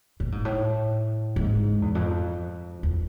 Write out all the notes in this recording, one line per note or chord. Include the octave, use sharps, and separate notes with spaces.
A2
G#2
A2
G#2
E2
F2
E2